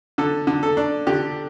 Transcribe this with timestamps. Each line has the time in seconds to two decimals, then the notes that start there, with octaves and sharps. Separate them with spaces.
0.18 D3 A4
0.47 D3
0.63 A4
0.77 D4
1.07 D3 G4